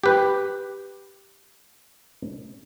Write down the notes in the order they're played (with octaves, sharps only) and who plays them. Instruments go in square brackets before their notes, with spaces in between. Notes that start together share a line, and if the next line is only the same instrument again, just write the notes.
[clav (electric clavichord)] G4 B4